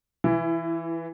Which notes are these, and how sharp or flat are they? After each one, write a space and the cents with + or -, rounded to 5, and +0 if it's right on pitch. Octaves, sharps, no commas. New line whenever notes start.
E3 +0 E4 +25